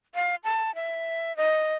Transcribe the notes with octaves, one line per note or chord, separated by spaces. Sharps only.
F5
A5
E5
D#5